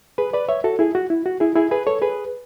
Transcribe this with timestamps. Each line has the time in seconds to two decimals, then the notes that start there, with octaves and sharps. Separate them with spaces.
0.18 G#4 B4
0.33 B4 D5
0.49 C#5 E5
0.64 F#4 A4
0.79 E4 G#4
0.95 F#4
1.10 E4
1.26 F#4
1.40 E4 G#4
1.56 E4 G#4
1.71 G#4 B4
1.87 A4 C#5
2.02 G#4 B4